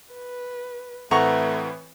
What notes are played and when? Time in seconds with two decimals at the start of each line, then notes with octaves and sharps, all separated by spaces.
0.13 B4
1.11 A2 E3 A3 C4 B4 F#5 A#5 C#6